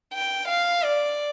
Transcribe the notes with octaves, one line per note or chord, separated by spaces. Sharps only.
G5
F5
D5